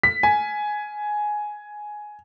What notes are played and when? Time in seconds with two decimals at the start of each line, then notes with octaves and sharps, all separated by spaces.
0.03 B6
0.23 G#5